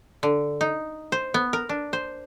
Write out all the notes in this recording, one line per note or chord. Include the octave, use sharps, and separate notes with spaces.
D3
D#4
C5
B3
A#4
D4
C5